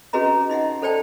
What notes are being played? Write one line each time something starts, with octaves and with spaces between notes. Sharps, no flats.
C#4 F#4 G#4 B4 D#5 A#5
D#4 D#5 E5 F#5
A4 C5 D5 G5 A5